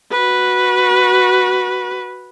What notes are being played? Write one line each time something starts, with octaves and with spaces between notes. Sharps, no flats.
F#4 B4